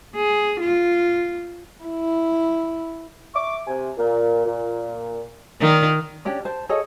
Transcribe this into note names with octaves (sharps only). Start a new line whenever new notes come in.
G#4
F4
E4
E5 C#6 D6
C3 G#5
A#2
A#2
A#2 D#3
C#4 D4 G4 D5
C5 A5
G#4 A4 C#5 D#5